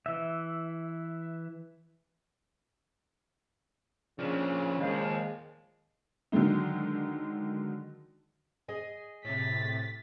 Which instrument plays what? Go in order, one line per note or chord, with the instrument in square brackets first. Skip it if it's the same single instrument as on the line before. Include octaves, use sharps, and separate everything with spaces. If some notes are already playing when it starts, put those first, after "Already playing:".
[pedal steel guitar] E3 E5
[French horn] C#3 [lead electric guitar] F3 D4
[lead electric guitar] D#2 [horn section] A#2 F3 G#3
[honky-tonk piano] D3 D#3 F#3 G#3 D#4
[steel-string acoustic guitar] G#4 D#5 G#5
[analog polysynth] A2 C3 [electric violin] A6 B6